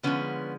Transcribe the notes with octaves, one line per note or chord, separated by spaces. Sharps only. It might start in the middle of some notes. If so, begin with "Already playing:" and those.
D3 F3 G#3 B3 C#4